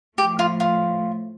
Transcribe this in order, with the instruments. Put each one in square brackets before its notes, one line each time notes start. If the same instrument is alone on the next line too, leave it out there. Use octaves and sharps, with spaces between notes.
[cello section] A2 F3 A3 [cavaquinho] G4
[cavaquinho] F4
F4